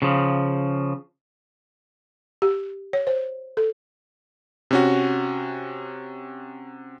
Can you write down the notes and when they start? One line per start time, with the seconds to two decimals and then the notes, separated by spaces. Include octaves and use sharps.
0.02 C#3 F3
2.42 G4
2.93 C#5
3.07 C5
3.57 A4
4.71 C3 C#4 F#4